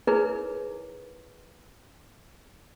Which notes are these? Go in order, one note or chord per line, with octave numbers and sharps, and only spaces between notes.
D#4 E4 G#4 A#4 B4 C#5